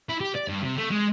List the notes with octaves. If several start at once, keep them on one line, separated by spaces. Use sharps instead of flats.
E4
G4
D5
G2
C3
A3
G#3